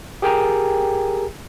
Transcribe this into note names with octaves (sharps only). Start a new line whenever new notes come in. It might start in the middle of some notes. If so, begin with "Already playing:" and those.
G4 G#4 A#4 G5 G#5 A#5